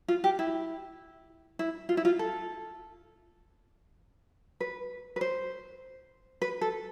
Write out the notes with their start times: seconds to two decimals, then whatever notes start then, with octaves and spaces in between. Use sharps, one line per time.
0.08 F4
0.24 G4
0.39 E4
1.59 E4
1.89 F4
1.97 E4
2.05 F4
2.19 A4
4.60 B4
5.16 B4
5.21 C5
6.42 B4
6.61 A4